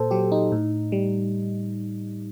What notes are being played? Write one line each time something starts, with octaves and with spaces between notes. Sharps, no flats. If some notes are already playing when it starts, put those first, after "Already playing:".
Already playing: A#2 A4 C5
F#3 G4
D#4
A2
G3